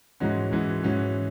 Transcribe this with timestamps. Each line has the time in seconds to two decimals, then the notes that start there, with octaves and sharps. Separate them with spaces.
0.20 G#2 E3 G#3 C#4 F#4
0.51 G#2 E3 G#3 C#4 F#4
0.83 G#2 E3 G#3 C#4 F#4